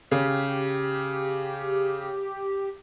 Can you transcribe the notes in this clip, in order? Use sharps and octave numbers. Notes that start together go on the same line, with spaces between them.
C#3 G4